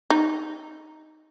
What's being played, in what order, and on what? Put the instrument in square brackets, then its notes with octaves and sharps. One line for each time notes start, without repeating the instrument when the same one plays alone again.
[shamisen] D#4